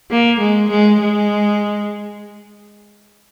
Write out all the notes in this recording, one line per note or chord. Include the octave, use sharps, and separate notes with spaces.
A#3
G#3
G#3
G#3